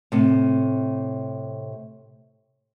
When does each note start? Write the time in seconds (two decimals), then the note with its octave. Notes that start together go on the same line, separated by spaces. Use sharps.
0.12 A2 C3